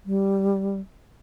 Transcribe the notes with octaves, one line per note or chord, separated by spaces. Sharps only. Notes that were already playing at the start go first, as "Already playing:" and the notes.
G3